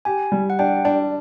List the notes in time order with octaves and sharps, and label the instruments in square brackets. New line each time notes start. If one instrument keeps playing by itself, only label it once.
[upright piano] G4 [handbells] G#5
[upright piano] G3
[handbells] F#5
[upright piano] D4 [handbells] G5
[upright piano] D4